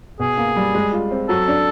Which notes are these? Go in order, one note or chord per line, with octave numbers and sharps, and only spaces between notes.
B2 G#4
A#3
G3
G#3
F4
C4
F#3 A4
D4